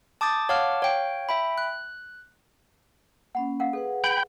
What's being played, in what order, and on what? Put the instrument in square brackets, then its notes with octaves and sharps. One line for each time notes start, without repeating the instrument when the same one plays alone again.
[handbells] A5 D6 D#6 G6 A6
C#5 F5 F#5 A5 D6 F6
C#5 F5 G5
E5 G5 B5
F#6
[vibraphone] A#3 C#4 [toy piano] F#5 B5
[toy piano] A#4 F5 F#5
[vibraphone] G#4 B4 F#5 [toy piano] A4
[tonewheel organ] G5 B5 G6